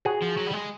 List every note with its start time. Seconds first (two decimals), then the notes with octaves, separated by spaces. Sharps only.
0.05 F#4 G#4
0.22 F3
0.37 F#3
0.47 G3
0.53 G#3